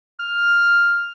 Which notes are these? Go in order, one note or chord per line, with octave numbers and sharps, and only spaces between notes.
F6